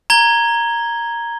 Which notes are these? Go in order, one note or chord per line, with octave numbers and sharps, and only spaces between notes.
A#5 G#6 G7